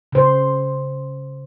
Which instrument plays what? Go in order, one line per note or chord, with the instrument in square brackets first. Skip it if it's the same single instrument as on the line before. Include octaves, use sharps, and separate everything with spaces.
[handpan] C#3 C5